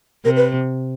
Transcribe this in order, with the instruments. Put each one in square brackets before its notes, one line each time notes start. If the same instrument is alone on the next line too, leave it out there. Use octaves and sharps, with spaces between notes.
[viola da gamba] C3 [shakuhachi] A#4
[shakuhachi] B4